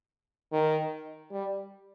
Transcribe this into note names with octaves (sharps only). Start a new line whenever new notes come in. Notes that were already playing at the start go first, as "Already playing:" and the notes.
D#3
G3